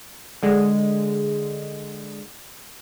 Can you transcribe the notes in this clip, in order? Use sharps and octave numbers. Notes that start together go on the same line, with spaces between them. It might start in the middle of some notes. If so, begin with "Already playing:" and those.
D3 G#3